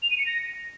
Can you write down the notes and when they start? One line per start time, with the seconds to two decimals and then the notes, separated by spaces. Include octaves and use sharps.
0.03 F7
0.11 D#7
0.19 C#7
0.26 A#6